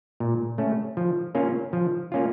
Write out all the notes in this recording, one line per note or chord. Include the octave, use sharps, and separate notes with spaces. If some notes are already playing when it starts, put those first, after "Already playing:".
A#2
A3 C#4
F3
A#3 C#4 F4
F3
A#3 C#4 F4